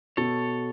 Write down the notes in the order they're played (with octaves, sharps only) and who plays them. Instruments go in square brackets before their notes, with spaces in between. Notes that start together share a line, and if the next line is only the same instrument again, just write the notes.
[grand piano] B2 [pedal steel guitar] A4 C#5